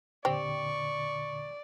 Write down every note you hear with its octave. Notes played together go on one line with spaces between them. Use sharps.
E2 A#2 D3 C4 G4 D5 C#6